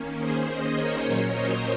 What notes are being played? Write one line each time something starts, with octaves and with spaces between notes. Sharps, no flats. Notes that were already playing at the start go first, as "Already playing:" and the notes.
Already playing: D#3 A#3 C#4
G#4 C5
C5 D#5
A#4 C#5
A#2 F#3 C#4
C5 D#5